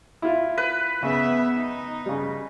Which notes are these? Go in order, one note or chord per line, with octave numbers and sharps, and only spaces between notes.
E4 F4
B4
C#3 B3 E5
D#4
C#3 G3